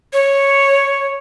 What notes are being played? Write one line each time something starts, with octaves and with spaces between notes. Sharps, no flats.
C#5